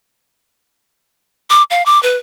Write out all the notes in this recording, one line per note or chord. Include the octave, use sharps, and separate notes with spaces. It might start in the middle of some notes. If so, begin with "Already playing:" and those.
D6
F5
D6
B4